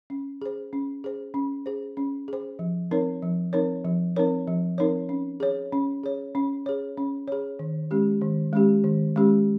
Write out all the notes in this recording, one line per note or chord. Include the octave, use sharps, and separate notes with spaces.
C#4
G#4 C5
C#4
G#4 C5
C#4
G#4 C5
C#4
G#4 C5
F3
C4 D#4 A#4 C#5
F3
C4 D#4 A#4 C#5
F3
C4 D#4 A#4 C#5
F3
C4 D#4 A#4 C#5
C#4
G#4 C#5
C#4
G#4 C#5
C#4
G#4 C#5
C#4
G#4 C#5
D#3
G#3 C#4 G4
D#3
G#3 C#4 G4
D#3
G#3 C#4 G4